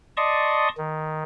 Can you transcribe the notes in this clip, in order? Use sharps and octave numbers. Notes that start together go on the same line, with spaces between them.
D5 D#5 A5 C6 C#6 D#6
D#3